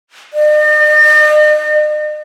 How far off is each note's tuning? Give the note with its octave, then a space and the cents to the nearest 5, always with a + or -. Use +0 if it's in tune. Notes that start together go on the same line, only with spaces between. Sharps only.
D#5 -45